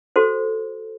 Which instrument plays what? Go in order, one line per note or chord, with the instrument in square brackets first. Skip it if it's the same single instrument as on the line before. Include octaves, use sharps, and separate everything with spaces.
[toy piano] F#4 A4 C5